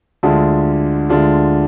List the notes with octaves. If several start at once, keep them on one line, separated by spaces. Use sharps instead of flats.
D2 D3 G#3 D4 F4
D2 D3 G#3 D4 F4